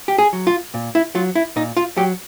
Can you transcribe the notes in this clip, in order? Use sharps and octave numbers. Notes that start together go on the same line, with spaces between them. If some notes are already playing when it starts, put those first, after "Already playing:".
G4
G#4
F#3
F4
A#2
E4
F#3 F4
E4
A#2 D#4
F4
F#3 G4